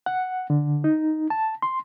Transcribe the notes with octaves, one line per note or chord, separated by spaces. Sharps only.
F#5
D3
D#4
A5
C6